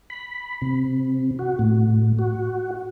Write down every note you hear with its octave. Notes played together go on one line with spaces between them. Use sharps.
B5
C3
F#4
A2
F#4